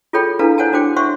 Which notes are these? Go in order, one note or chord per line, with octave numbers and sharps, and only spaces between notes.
F4 G#4 A4 C#5 G5 B5
D4 E4 A4 B4 F5 A#5
C5 C#5 F#5 G#5 A5
D4 F#4 C5 G5 D6
C5 C#5 E5 F#5 C6 C#6